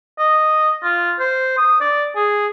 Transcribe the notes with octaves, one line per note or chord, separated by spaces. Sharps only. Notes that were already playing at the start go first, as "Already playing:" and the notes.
D#5
F4
C5
D#6
D5
G#4